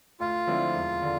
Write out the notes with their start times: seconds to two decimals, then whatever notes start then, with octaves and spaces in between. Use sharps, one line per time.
0.20 D2 F4
0.47 D3 F3 C4 E4
0.75 E1
1.02 D3